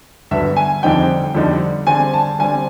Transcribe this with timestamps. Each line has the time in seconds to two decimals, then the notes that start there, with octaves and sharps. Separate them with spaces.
0.31 G2 D3 F#3 B3 E5
0.56 G#5
0.83 F2 D3 G3 C4 D#4 G5
1.35 F2 D3 G3 C4 D#4
1.87 D3 G3 C4 G#5
2.14 A5
2.39 D3 G3 C4 G#5